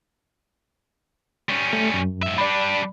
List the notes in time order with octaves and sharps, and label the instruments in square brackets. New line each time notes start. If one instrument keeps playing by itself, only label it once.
[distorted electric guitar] G3 C#4
[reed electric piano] A3
F#2
[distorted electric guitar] G#2 E5
[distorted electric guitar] G3 D4 [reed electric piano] D5 B5